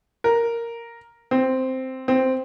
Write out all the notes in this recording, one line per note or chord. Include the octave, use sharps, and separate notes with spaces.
A#4
C4
C4